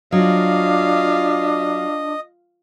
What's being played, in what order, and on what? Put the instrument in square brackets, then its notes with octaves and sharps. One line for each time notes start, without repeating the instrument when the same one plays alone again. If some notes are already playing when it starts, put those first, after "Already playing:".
[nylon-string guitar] F#3 [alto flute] D4 [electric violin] F4 F5 [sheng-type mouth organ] D#5